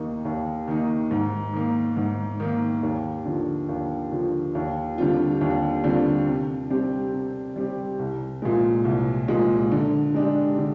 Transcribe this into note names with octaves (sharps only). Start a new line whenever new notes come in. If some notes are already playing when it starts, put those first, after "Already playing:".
Already playing: D#2 D#3 A#3 D#4
D#2
D#3 A#3 D#4
G#2
D#3 A#3
G#2
D#3 A#3
D#2
D3 F3
D#2
D3 F3
D#2
D3 G3 C4 F4
D#2
D3 G3 C4 F4
C3
G3 C4 G4
C3
G3 C4 G4
C2
A#2 F3 G#3
C2
A#2 F3 G#3
D3
G#3 D4 G4
D3